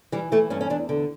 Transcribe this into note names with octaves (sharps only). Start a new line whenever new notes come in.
E3 G3
E3 A3
G2 C#4
C#4
E2 D4
D3